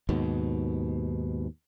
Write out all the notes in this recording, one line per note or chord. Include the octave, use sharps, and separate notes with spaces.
D#2 G#2 B2